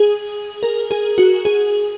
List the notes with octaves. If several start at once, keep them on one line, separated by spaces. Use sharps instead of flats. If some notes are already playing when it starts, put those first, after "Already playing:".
Already playing: G#4
A#4
G#4
F#4
G#4